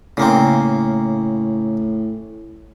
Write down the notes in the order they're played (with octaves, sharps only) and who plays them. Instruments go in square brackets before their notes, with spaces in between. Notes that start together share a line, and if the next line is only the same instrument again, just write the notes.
[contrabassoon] A2 [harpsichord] C#3 A#3 C4